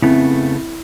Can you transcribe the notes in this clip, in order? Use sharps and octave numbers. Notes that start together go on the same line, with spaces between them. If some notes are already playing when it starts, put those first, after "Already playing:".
F2 C#3 A3 B3 E4